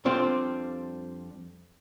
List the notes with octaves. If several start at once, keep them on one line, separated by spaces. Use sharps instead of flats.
F2 G3 C4 D4 F4